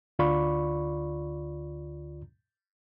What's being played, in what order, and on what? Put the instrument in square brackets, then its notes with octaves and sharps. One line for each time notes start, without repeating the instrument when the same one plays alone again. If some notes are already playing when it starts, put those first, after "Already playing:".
[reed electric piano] D2 D3 F4 D5 B5 C#6